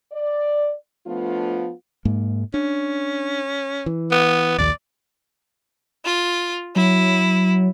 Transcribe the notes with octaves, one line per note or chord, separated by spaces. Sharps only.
D5
F3 A3 B3 D4 F4
G#2 G#3 A#3
C#4 D4
E3
B3
A#1 D#2 A#2 D5
F4
F#3 E4